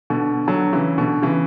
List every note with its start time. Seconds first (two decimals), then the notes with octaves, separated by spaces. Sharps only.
0.10 B2 D3
0.48 D3 F#3
0.73 C#3 E3
0.98 B2 D3
1.22 C#3 E3